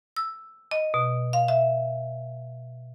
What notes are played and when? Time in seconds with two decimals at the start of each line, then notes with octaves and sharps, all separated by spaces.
0.16 E6
0.71 D#5
0.94 B2
1.33 F5
1.48 E5